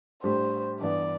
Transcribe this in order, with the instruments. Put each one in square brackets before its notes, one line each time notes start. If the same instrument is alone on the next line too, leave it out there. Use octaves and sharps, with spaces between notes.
[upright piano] A2 G3 D4 G4 [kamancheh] C5
[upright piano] G2 E3 B3 [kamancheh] D5